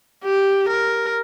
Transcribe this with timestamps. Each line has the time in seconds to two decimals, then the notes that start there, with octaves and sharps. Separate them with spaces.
0.24 G4
0.69 A#4